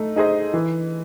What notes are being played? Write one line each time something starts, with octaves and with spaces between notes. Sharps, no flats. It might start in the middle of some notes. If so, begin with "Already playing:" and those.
Already playing: A3 D#4
D#4 G#4 C5 D#5
E3